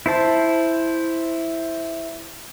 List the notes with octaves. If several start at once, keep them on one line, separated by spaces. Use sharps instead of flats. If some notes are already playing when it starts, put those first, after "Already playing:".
E4 C5 A5